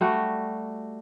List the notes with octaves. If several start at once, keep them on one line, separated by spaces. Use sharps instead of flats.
G3 A3 F#4